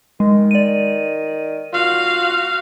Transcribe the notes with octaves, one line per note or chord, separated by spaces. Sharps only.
D#3 G#3
D5 D#7
F4 F#4 F5